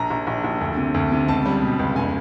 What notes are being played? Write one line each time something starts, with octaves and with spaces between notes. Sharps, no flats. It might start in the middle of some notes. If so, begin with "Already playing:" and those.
Already playing: A#1 A#5
A#1
A#1
A#1
D2
C3
D2
C3
C#2 A5
G3
B2
C#2
F1 G#5